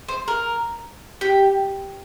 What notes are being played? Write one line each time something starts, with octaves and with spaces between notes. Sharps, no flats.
C5
A#4
G4